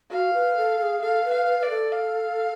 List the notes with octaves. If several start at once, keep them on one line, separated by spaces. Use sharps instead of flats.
F#4 F5
B4
A4
A4
G#4
A4 F5
B4
F5
B4
B4 D5
A4
F5